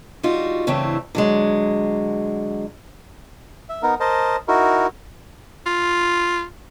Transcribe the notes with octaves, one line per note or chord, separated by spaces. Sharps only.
G3 D#4 F4 F#4
G2 C#3 E3 A3 C4
D3 F#3 G#3
E5
B3 D#4 A#4
A#4 C5 D#5 A5
D#4 E4 F#4 A#4
F4